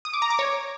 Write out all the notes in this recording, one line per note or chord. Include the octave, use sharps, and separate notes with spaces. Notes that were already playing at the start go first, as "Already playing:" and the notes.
D#6
D6
A#5
D6
C#5